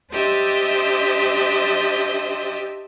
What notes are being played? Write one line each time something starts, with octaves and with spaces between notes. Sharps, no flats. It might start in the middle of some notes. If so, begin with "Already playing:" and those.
D4 G4 C5 D#5 E5 E6